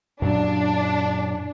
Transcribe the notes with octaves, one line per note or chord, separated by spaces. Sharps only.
F#2 A#2 F#3 D4